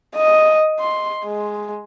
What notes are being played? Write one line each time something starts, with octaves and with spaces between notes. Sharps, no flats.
D#5
C6
G#3